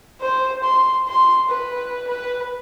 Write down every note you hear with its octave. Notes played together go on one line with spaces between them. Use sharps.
C5
C6
C6
B4
B4